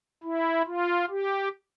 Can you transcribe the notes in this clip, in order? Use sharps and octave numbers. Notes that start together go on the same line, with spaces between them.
E4
F4
G4